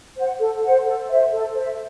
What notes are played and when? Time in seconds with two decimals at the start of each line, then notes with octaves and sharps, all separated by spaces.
0.16 C5 F#5
0.40 A4
0.63 C5 F#5
0.86 A4
1.09 C5 E5
1.32 A4
1.55 C5 E5